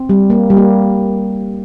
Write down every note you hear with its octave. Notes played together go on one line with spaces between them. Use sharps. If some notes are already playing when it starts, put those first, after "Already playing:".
Already playing: C4
G3
A#3
G3
A#3